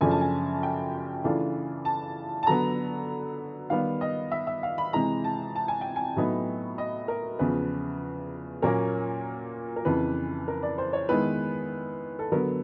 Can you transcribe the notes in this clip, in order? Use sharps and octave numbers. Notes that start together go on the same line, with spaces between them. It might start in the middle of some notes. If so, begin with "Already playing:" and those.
F#2 C#3 F3 A3 D4 G#5
A5
G#5
G5
C#3 E3 A3 D4 F4
A5
A5
D3 F#3 B3 A#5
D#3 G3 B3 F5
D#5
E5
E5
F5
B5
C3 E3 G#3 A#5
A5
A5
G#5
G5
G#5
A2 F#3 B3 D#4
D#5
A#4
E2 C#3 F3 B4
A#2 F#3 A#3 C#4 A#4
A#4
F2 C#3 E3 B4
A#4
D5
C5
C#5
D#3 G#3 B3 E4 B4
A4
D3 F#3 B3 A#4